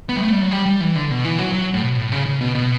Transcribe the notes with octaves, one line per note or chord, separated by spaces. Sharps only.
B3
G3
A3
G3
F#3
G3
G3
E3
D3
B2
E3
F#3
F#3
A2
B2
A2
C#3
C#3
B2
B2